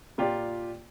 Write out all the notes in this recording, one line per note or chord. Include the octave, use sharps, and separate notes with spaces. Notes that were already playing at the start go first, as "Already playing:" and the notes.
A#2 F4 G4 D5